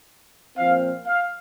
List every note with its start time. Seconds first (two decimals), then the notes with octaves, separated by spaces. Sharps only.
0.57 A#2 F3 C4 F5
1.07 F5